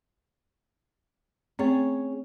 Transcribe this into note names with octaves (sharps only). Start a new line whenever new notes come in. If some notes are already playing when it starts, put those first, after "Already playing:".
A3 C4 C#4 G#4 C#5